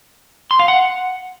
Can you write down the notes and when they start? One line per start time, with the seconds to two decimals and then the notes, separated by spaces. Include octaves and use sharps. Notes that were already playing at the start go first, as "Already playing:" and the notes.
0.51 C6
0.59 F5
0.68 F#5